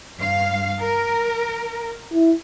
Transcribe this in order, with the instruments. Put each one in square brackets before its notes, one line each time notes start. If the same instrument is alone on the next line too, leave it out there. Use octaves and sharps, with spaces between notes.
[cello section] G2 F5
A#4
[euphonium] E4